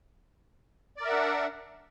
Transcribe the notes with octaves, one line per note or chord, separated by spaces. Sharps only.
D4 A#4 D5 E5 F#5